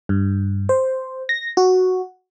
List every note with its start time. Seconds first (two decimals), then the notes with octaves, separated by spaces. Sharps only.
0.09 G2
0.69 C5
1.29 A#6
1.57 F#4